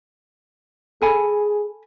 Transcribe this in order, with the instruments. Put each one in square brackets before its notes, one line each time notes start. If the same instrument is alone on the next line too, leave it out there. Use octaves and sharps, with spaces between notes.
[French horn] G#4 [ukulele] A4 G#5 B5